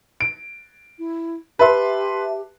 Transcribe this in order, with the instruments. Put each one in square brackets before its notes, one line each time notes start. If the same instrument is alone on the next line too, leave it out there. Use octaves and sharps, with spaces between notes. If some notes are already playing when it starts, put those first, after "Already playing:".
[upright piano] D7
[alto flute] E4
[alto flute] G4 [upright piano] B4 C6 [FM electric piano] E5 A5